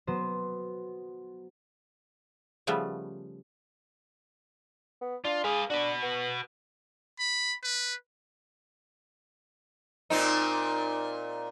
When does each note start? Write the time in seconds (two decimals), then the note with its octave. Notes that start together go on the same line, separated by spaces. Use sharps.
0.07 F#3 B3 C5
2.67 C#3 F3 G3 A3 B3
5.01 B3
5.25 D4 F4
5.44 G#4 B4 F5
5.70 D4 F#4 B4
6.02 B3
7.19 B5
7.63 B4
10.10 A#2 C4 D#4